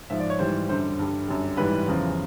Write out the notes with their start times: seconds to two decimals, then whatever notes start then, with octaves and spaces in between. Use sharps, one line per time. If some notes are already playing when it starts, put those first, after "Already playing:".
0.10 G#2 F3 E5
0.20 D5
0.30 C#5
0.39 G#2 E3 G3 C5
0.69 F#2 D3 G3 C5
0.99 G2 D3 G3
1.28 F#2 D3 G3
1.57 G#2 E3 G3 B4
1.87 E2 C#3 F3